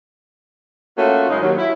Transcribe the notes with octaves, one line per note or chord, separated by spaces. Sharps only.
A3 A#3 C#4 F4 F#4
F#2 C#3 F#3 G#3 D#4
D#2 F#3
E4